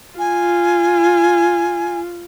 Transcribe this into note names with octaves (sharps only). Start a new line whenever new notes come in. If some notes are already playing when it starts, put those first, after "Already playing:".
F4 G#5